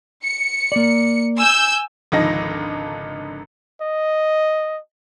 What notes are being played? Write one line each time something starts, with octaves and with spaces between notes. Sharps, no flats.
C#7
A#3 D5
G#5 E6 G6
G#1 C#2 D3 F3 D#4 A#6
D#5